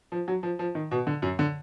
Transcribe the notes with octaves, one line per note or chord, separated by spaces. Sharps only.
F3
F#3
F3
F3
D#3
B2
D3
F#2
D3